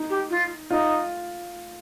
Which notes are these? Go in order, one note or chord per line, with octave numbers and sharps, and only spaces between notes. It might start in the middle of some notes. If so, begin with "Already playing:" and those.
Already playing: D#4
G4
F4
D#4 F4